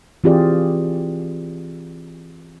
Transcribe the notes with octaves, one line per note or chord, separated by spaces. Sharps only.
E3 C4 F4 G4 G#4 D5